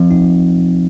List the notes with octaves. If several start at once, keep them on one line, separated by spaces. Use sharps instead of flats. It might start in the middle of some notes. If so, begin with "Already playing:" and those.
Already playing: F3 C4
D#4